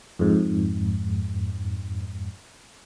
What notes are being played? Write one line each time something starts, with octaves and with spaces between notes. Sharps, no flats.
F2 G#2